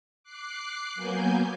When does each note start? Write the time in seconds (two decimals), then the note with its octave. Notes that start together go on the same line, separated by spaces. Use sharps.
0.23 D6 F#6 C7
0.95 F#3 A#3 B3 G#5 G6